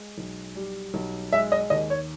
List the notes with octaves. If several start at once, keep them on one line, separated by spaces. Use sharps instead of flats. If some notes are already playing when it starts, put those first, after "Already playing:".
Already playing: G#3
B1
G3
B1
G#3 E5
D#5
D#2 D#5
C#5